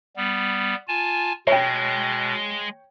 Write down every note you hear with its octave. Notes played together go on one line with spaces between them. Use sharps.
G3 B3
F4 G#5 A5
B2 G#3 C#5 G5